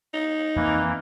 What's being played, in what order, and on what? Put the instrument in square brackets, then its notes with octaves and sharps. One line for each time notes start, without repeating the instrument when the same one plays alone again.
[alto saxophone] D#4
[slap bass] F2 C4 [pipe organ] E3 A#3